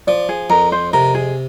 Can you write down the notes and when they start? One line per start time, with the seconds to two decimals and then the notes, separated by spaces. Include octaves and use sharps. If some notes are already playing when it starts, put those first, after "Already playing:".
0.07 F3 D5
0.29 G#4
0.50 F2 A#4
0.72 C5
0.93 C3 A#4
1.14 G#4